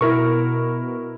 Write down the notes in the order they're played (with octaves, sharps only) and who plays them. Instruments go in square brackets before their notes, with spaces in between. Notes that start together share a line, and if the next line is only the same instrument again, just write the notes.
[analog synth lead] B2 [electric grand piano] E4 A#4 C#6